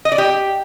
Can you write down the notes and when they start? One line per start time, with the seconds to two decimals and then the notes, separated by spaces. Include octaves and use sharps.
0.05 D#5
0.12 D5
0.18 G4